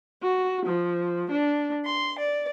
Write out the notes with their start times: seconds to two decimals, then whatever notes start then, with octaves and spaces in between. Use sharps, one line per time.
0.22 F#4
0.65 F3
1.31 D4
1.84 C6
2.18 D5